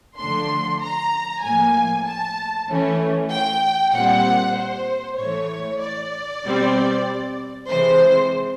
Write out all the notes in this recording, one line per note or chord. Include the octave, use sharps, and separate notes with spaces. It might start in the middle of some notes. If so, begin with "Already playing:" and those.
D3 F3 A3 D4 C6
A#5
A2 F3 A#3 G#5
A5
E3 A3 C#4
G5
A#2 G3 C4 F#5
C5
A2 E3 A3 C#5
D5
B2 G3 C4
C3 E3 G#3 C5